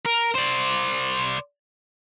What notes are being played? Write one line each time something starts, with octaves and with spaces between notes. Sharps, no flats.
A#4
C5 D5